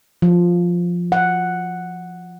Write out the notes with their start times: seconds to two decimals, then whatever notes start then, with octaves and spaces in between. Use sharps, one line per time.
0.22 F3
1.12 F#5